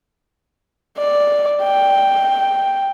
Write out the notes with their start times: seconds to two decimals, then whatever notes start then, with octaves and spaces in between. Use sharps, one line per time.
0.98 D5
1.62 G5